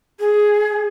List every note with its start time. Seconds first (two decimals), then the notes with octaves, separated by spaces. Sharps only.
0.19 G#4